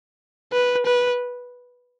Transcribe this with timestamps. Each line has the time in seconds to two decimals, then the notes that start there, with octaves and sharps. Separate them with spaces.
0.53 B4
0.86 B4